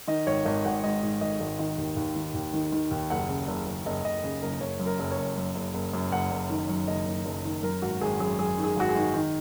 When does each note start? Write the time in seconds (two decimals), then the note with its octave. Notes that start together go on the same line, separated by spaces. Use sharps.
0.08 D#3 D#5
0.27 G#1 C#5
0.45 G#1 D#5
0.65 G#1 F#5
0.84 G#2 D#5
1.02 G#2
1.21 G#1 D#5
1.40 G#1
1.59 D#3 D#5
1.78 D#2
1.96 D#2
2.16 D#3
2.34 D#2
2.53 D#3
2.72 D#3
2.91 D#2
3.10 F#1 F#5
3.29 C#3
3.48 F#1
3.67 F#1
3.86 F#1 D#5
4.04 F#1 D#5
4.24 C#3
4.42 F#1 A#4
4.61 F#1 C#5
4.80 F#2
4.86 A#4
4.99 F#1
5.11 C#5
5.17 F#1
5.37 F#2
5.55 F#1
5.74 F#1
5.93 F#2
6.12 F#1 F#5
6.31 F#1
6.49 D#3
6.69 F#2
6.88 F#1 D#5
7.06 F#1
7.26 F#1
7.45 D#3
7.63 F#2 A#4
7.82 G#1 F#4
8.01 G#1 G#4
8.20 F#2 G#4
8.38 F#2 G#4
8.58 D#3
8.64 G#4
8.77 G#1 F#4
8.89 G#4
8.96 D#3
9.14 D#3